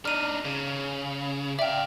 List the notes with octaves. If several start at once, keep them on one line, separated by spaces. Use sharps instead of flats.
D4 D#4 F6 D#7
C#3
D5 E5 F5 G5